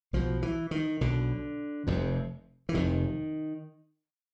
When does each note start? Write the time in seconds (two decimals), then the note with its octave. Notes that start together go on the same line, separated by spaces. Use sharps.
0.13 B1 B2 F3
0.42 E3
0.71 D#3
1.01 B1 B2 D3
1.87 F1 F2 C3
2.69 E3
2.74 F1 F2 C3 D#3